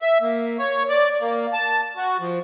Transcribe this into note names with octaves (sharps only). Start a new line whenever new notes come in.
E5
A#3
C#5
D5
A#3
A5
F#4
F3